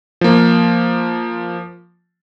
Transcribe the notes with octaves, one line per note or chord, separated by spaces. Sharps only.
F3 A#3